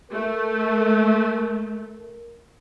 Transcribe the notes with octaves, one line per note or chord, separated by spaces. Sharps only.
A3 A#4